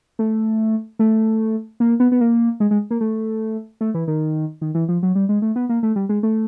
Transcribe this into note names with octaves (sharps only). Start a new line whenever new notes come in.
A3
A3
A#3
B3
B3
A#3
G#3
G#3
A#3
A3
A3
E3
D#3
D#3
E3
F3
F#3
G3
G#3
A3
B3
A#3
A3
G3
G#3
A3